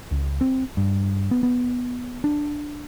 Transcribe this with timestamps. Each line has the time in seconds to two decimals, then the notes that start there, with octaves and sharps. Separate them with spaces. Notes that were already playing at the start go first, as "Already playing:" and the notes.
0.11 C#2
0.41 C4
0.77 G2
1.31 B3
1.43 B3
2.24 D4